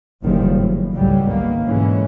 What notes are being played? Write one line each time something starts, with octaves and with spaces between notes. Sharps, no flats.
F#1 A2 D#3 F3 G3
A2
G#1 C#2 A2 F#3 G3
D#3 A#3 B3
G#2 B2 D3 E3 G#3 C#4